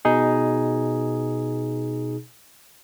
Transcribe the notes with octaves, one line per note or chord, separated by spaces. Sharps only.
B2 D#4 G#4